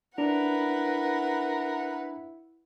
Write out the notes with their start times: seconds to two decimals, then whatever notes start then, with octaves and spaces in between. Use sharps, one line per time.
0.18 D4 E4 A#4 B4 F#5